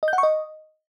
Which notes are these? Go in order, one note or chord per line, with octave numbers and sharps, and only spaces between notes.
D#5
G6
F#5
C#6
D#5